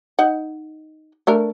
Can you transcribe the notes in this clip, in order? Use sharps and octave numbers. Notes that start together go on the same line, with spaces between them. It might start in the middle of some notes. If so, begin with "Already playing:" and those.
D#4 F#5
A3 D4 A#4